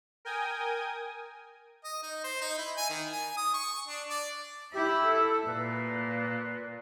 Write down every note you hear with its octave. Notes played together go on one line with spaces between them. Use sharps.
A#4 G5 G#5 D#6
D#5
D#4
C5
D#4
E4
G#5
D#3
G#5
D#6
C#6
D4
D5
E4 G4 E5
A4
A#2 B4